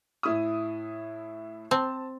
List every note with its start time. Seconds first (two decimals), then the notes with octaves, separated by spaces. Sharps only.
0.23 A2 E4 D#6
1.71 C4 A5